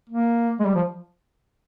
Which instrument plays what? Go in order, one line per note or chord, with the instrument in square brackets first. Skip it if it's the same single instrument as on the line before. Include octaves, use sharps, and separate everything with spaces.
[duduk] A#3
G#3
G3
F3